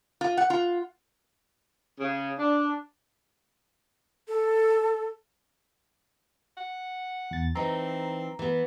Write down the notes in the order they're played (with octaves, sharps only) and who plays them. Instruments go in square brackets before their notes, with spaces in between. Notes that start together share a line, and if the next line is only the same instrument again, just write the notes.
[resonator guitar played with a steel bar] F4
F#5
F4
[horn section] C#3
D4
[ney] A4
[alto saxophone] F#5
[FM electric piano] E2 A6
[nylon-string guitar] E3 D#4 [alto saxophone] C4 [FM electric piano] A#5
[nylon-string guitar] E3 B3